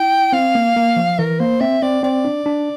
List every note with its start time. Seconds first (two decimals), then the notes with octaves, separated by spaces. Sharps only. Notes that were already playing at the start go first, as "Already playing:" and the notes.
Already playing: E4 G5
0.33 C4 F5
0.55 A#3
0.76 A#3
0.96 F3
1.19 E3 A#4
1.39 A#3 C5
1.61 C4 E5
1.82 C4 D5
2.03 C4 D5
2.25 D4
2.46 D4